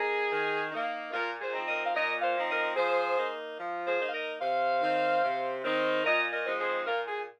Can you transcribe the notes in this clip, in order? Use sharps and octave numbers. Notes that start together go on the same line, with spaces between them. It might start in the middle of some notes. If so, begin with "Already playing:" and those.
Already playing: A#3 D#4 G#4
D#3
A#3 D#4
A#2 F4 A#4
G#4 C5
F3 C4 D#4
A#4 D#5
F5
A#2 A#4 D#5
C5 F5
F3 C4 D#4
A#4 D#5
F3 G#4 C5
A#3 D#4
F3
G#4 C5
A#3 D#4
F5
A#4 D#5
C3 C5 F5
D#3 C4 D#4
C3
D#3 C4 D#4
A#2 A#4 D#5
A#4 D#5
F3 G#3 C4 D#4
G#4 C5
A#2 F4 A#4
G#4